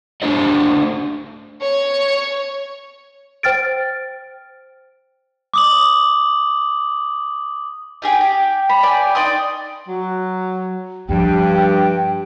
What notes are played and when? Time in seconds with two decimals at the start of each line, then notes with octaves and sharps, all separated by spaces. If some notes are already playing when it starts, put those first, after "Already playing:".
0.22 A3 D4 C5 D5 D#5
1.61 C#5
3.43 C5 G5 F6 A6 D7
5.54 D6 D#6 F#7
8.02 D#4 G4 G#4 G5
8.21 G4
8.69 B5
8.83 D5 G5 G#5
9.15 D#4 D5 C6 D#6
9.88 F#3
11.09 G2 F3 G3 G5